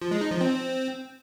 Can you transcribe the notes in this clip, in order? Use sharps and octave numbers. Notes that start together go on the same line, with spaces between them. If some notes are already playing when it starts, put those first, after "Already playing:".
F3
G#3
D#4
F3
C4